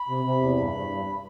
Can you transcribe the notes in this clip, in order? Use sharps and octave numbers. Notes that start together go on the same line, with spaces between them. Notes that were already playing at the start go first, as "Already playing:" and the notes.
Already playing: B5
C3
C3
E2
G2
G2
G2